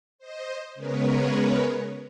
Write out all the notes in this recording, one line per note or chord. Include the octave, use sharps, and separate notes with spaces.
C5 D#5
C#3 G#3 B3 A#4 B4 C#5